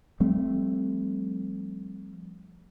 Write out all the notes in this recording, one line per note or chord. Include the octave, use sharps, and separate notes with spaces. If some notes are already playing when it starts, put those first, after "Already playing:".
F3 G3 A3 C4